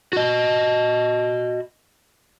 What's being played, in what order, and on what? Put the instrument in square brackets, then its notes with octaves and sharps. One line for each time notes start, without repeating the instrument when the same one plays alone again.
[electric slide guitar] F#4 D#5